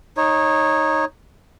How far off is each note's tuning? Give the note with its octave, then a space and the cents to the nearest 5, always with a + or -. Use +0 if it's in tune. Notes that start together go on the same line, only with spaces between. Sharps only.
D#4 +0 C#5 -15